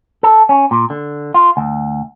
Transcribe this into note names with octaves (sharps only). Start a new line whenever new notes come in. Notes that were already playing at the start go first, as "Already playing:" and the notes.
A4
C#4
A#2
D3
F4
D2